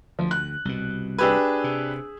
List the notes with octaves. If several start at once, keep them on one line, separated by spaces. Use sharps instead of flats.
D2 F3
F#6
C2 B2
D4 G4 G#4 B4 E6 G#6
C3